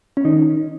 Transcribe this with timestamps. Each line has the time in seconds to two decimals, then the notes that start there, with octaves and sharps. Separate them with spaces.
0.17 C#4
0.25 D#3 D#4